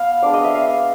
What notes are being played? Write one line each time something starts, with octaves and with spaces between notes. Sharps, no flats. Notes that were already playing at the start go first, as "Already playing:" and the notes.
Already playing: B3 F5
G#3 B3 D4 D5
D#5
E5
F5